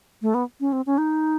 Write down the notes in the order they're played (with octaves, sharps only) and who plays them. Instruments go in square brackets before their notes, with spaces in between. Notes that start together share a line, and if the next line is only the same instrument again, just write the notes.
[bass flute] A3
B3
C#4
C4
C#4
D#4